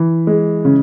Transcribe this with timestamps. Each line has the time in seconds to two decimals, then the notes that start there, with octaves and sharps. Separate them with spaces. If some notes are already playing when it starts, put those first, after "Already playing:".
Already playing: E3
0.27 G#3
0.65 C#3